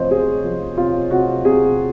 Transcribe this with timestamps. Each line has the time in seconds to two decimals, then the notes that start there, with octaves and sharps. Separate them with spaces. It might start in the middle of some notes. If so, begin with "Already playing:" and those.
Already playing: C3 F3 C5 C#5 D#5
0.10 C3 G#4
0.44 F3
0.77 C3 F4
1.11 C3 F#4
1.44 C3 G#4